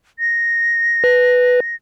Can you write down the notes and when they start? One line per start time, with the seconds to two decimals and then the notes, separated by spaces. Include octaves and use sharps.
0.19 A#6
1.04 B4